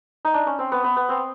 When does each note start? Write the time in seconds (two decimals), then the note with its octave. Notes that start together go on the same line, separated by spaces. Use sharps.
0.25 D#4
0.34 D4
0.47 C#4
0.59 C4
0.72 B3
0.84 B3
0.96 B3
1.09 C4